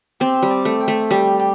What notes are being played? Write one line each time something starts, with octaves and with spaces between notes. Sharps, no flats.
C4 G4
G3
D5
A3
G5
A3
G3 G4
G4